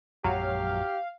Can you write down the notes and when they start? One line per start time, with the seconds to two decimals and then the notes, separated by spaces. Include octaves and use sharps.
0.24 A#1 F#2 F#3 G#3 G4 F5